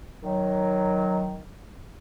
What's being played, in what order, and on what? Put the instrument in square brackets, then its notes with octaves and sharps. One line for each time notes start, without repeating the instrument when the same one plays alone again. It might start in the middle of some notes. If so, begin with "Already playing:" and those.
[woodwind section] D#3 F#3